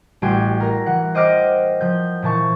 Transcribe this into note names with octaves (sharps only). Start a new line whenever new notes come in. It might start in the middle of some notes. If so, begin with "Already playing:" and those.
A1 G3 F#4 G5 G#5 C6
A#4 A#6
E3 F#5
C5 D#5 G5 D6 F6 A#6
F3 G6
A#2 E3 A5 C#6